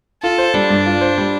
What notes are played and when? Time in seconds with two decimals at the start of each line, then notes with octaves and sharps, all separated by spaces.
0.23 F4 A4
0.38 C5
0.54 G3 D4
0.70 G2
0.86 F4
1.01 C5
1.18 G3